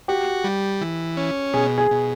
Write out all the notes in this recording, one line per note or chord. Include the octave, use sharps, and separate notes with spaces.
F#4 G4
G3
E3
C#4
B2 G#4
G#4
B2